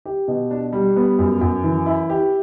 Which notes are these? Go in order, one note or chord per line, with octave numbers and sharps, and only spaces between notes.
G4
B2
D4
G3
B3
F#2
F#2
E3
E4
G4